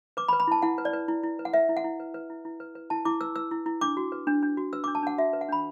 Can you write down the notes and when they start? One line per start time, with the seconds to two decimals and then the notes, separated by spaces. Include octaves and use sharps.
0.17 B4 D6
0.28 B5
0.33 B4
0.40 B5
0.47 E4 A5
0.62 E4 F#5
0.78 B4
0.85 D5
0.93 B4
1.08 E4
1.23 E4
1.39 B4
1.45 F#5
1.53 B4 E5
1.69 E4
1.77 F#5
1.84 E4
2.00 B4
2.14 B4
2.30 E4
2.45 E4
2.60 B4
2.75 B4
2.90 E4 A5
3.05 E4 D6
3.21 B4 E6
3.36 B4 E6
3.51 E4
3.66 E4
3.81 D4 D6
3.97 F#4
4.12 B4
4.27 D4
4.43 D4
4.57 F#4
4.73 B4 E6
4.84 D4 D6
4.95 A5
5.03 D4 F#5
5.18 F#4 E5
5.33 B4
5.41 F#5
5.49 D4 B5